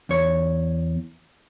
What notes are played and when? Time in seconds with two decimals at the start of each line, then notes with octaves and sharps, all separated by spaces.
0.09 E2 C#5